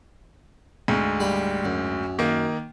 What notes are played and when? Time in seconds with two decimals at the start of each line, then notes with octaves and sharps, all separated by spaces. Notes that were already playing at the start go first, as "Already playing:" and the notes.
0.88 D2 G#2
1.20 G3 F5 B5
1.65 F#2
2.19 D#3 A#3